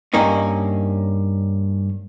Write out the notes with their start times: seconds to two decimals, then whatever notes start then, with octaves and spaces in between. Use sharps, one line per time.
0.14 G2 A#3 C#4 D#4